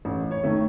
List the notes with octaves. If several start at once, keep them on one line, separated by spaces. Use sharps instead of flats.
A1
C#5
D#3 A3